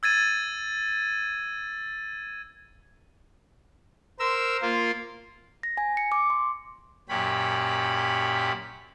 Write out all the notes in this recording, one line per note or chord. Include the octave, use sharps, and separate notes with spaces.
E6 G#6 A6 D#7
A#4 C5 E6
A#3 F4
A#6
G#5
C#7
D6
C6
F#2 A#2 C#4 G4 B5